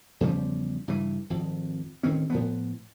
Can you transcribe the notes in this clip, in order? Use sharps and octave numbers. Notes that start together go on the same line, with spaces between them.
E2 C#3 F3 G3
G2 C#3 E3
G#1 F2
D1 D#3 C4 C#4
A2 F3 B3